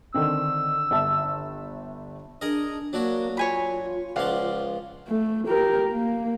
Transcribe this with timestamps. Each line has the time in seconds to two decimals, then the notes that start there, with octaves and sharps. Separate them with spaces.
0.14 D3 D#3 C4 E6
0.91 G1 E5 A5
2.41 D4 G#4 A#4 D#5
2.93 F#3 A#3 D4 F#4
3.37 F4 C#5 G#5 B5
4.16 C#2 F3 D5 F5 F#5 C6
5.08 A3
5.48 G4 A#4
5.91 A#3